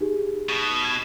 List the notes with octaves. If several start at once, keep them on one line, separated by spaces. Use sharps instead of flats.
D#4 G4 G#4
B2
G#6